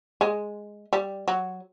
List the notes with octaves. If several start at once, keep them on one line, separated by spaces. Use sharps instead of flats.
G#3
G3
F#3